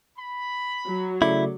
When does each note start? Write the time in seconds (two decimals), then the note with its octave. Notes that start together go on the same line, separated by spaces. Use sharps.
0.18 B5
0.86 F#3
1.22 C#3 A3 E4 D5